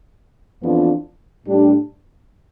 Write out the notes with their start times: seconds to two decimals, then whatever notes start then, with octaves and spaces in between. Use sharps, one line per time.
0.62 F2 E3 B3 D4 F4
1.45 A2 G3 D4 G4